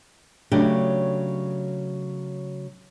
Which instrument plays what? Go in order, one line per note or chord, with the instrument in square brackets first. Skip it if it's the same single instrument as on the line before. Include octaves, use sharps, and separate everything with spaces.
[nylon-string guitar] C#3 F#3 A3 D4 G4